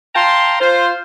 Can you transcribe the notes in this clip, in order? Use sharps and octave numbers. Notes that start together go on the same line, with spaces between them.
F5 G5 A5 A#5 C6
F4 C5